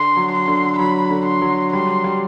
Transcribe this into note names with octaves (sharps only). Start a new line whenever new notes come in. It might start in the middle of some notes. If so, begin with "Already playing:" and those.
Already playing: D3 C6
F#3
C6
D3
F#3 B5
D3
C6
F#3
G3 C6
G3